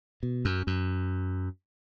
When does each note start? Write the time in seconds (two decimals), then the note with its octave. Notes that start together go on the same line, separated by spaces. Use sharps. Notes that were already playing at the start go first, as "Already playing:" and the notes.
0.23 B2
0.45 F#2
0.67 F#2